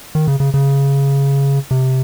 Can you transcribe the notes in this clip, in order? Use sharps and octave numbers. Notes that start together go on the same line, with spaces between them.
D#3
C#3
C#3
C#3
C3